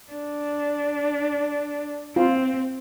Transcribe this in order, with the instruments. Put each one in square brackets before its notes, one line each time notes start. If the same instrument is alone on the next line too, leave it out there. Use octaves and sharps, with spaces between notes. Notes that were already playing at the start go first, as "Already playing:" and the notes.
[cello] D4
[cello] C4 [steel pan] F4